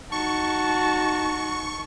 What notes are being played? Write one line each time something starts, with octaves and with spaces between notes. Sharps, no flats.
D#4 F#4 A5 C#6